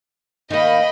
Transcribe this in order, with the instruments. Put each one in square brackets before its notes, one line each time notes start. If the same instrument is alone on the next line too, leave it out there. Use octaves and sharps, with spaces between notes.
[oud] D#3 A#3 [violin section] D#5 G5 B5